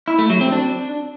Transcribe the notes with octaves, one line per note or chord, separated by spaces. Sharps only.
E4
A3
F#3
C4
D4